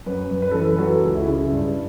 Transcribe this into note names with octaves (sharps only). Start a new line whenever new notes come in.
F#2 B4
F#2
B4
E3 A4
B4
F#3 A4
C#2
E4
C#3
G2